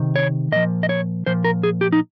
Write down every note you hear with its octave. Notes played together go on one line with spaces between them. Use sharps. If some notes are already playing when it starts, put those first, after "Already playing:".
Already playing: C3 D#3
C#5
A#2 F3 D#5
D#5
C#5
A#2 F3 C5
A#4
G#4
G4
D#4